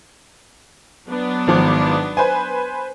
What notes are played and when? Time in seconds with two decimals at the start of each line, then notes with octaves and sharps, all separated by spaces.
1.07 F#3 B3 D4
1.47 G#1 F3 D6
2.17 B4 C5 G#5